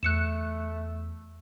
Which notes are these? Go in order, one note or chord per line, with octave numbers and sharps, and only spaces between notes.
E2 A3 E6 F#6 C#7 E7